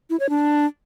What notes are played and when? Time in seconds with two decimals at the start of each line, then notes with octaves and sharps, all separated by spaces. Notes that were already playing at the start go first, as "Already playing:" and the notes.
0.10 E4
0.20 C#5
0.29 D4